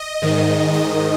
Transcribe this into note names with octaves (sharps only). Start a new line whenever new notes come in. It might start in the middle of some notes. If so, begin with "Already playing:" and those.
Already playing: D#5
G#2 D#3
D#5